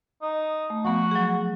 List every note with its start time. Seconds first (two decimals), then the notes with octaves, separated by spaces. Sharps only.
0.22 D#4
0.70 A3
0.85 F3 B3 F#4
1.11 F#3 G#4